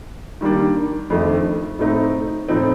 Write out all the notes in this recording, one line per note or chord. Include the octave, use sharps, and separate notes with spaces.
D#3 G3 A#3 D4
F2 D#3 A3 D4
A2 A3 C4 D#4
A2 F3 C4 D#4